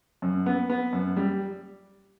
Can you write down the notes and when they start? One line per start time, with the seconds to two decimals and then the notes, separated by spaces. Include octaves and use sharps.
0.22 F#2
0.46 B3
0.70 B3
0.93 F#2
1.17 G3